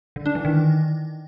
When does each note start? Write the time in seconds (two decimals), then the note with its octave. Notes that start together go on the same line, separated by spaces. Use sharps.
0.16 D3
0.26 D4
0.35 E3
0.45 D#3